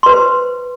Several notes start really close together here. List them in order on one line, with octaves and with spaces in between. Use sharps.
C6 B4 C5